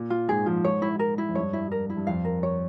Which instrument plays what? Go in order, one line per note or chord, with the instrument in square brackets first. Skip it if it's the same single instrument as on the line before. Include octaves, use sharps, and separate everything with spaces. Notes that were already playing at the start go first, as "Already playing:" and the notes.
Already playing: [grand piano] A#2
[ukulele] F4
[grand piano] G#2 [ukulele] G#4
[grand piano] F3 [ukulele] F4
[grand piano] G#2 [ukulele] C#5
[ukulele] E4
A#4
E4
[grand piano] F2
[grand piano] G2 [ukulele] C#5
[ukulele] E4
A#4
E4
[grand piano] G2
[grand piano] F2 [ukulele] F5
[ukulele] A#4
C#5